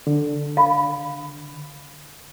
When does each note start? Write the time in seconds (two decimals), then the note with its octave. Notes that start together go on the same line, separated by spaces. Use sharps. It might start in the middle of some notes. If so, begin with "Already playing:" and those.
0.07 D3
0.57 F5 B5